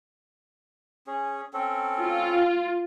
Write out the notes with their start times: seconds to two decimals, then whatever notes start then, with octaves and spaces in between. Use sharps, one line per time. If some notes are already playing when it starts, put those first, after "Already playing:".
1.07 C#4 G#4
1.53 C4 C#4 A4
1.99 F4